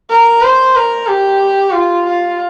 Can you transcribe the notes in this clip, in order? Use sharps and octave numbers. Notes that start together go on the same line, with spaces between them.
A#4
C5
A#4
G4
F4
F4